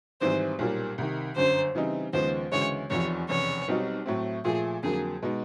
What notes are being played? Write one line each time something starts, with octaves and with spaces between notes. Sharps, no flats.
G#1 G#2 E3 G3 C4 C5
B1 A#2 G3 A#3
C2 C3 D#3
G1 F#2 D3 C5
C#3 E3 G3 C4 D#4
D#2 C#3 F3 G#3 B3 C5
D2 C#3 E3 G#3 C#5
F1 E2 C3 F3 C#5
F1 E2 C#3 C#5
B1 B2 G3 C4 D#4
A2 F#3 A3 C4
A#2 F3 A3 G#4
F2 D3 F#3 A#3 G#4
B2 G#3 B3 D#4